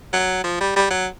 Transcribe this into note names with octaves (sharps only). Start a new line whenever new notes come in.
F#3
F3
G3
G3
F#3